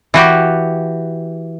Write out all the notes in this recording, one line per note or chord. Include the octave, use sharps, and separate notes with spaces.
E3 F#4 G4